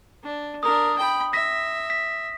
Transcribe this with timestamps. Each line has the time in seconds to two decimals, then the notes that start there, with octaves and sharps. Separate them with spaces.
0.23 D4
0.63 D4 A#4 D#6
0.98 G5 B5
1.33 E5 A#6 B6
1.90 B6